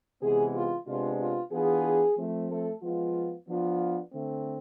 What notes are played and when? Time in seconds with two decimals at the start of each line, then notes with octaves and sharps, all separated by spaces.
0.22 C3 E3 G#3 B3 G#4
0.55 F4
0.87 C3 G#3 B3 D4 F4
1.20 F4
1.52 E3 B3 D4 F4 G#4
2.18 F3 A3 C4
2.50 A3 A4
2.82 F3 G#3 B3 F4
3.48 F3 B3 D4 F4
4.12 D3 A3 C4